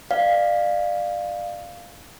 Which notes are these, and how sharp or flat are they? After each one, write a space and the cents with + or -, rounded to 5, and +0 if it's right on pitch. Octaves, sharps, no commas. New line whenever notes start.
D5 +30 F5 +0